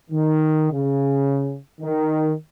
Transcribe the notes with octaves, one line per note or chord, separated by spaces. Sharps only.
D#3
C#3
D#3